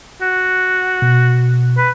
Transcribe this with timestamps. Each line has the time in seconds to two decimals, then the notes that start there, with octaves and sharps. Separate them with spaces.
0.22 F#4
1.02 B2
1.78 B4